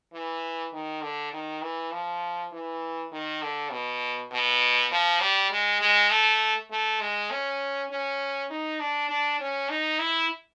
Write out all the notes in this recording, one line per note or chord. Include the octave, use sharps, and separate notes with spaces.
E3
D#3
D3
D#3
E3
F3
E3
D#3
D3
B2
B2
F3
G3
G#3
G#3
A3
A3
G#3
C#4
C#4
D#4
D4
D4
C#4
D#4
E4